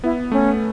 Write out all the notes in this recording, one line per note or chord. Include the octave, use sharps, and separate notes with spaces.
B3 E4
A3 C#4